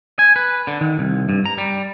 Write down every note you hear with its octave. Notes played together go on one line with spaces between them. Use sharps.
G#5
B4
D3
D#3
C2
G2
A#5
G3